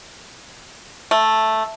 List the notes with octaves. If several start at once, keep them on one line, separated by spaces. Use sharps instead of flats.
A3